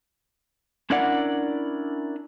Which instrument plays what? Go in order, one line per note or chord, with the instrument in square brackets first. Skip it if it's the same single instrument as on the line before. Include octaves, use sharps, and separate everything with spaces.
[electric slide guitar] C#4 D4 E4 A#4 D5 F#5